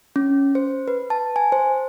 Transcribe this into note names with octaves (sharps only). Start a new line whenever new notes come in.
C#4
C5
B4
A5
G#5
C5